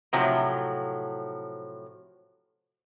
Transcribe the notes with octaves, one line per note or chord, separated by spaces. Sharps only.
A2 C3 F3 F#3